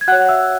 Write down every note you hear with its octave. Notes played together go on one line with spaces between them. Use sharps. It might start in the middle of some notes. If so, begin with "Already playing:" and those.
G#6
F#4 C#5 F#5 F#6
E5 E6